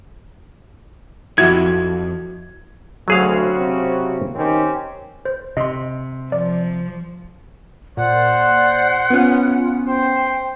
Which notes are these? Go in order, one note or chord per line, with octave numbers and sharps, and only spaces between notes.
B1 F2 E4 F#4 G4 G#6
D2 C#3 F#3 C4 F#4 G#4 F5
C3
D#3 C4 C#4 G4
C5
C3 D#5 C6
F3 D5
A#2 C5 D5 F#5
B3 C#4 F4
C5 G5